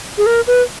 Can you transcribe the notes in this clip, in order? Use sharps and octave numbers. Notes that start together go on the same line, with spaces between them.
G#4
A#4
B4